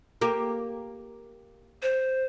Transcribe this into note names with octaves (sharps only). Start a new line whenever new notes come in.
A#3 G4
C5